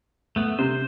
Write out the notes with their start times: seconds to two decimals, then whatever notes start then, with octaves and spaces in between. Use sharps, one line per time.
0.36 A3 B3
0.59 C3 C5